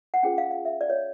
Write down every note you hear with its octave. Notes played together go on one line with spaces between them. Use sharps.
F#5
C#4 F4 G#4 C5 G5
F5
F5
E5
D5
C#5